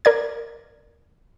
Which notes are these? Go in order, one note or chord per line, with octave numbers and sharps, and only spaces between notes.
A#4 D5 G#6